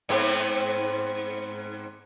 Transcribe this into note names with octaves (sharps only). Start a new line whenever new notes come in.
G#2 B3 C4